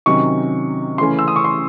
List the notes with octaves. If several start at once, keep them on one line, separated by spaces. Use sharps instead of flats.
C3 D#3 F#3 C#4 C#6
C#3 E3 A3 C#4 C6
E6
D#6
C#6
C6